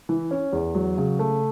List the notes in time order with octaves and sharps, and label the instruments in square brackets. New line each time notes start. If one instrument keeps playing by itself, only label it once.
[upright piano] E3
C#4
E2
F#3
C#3
A3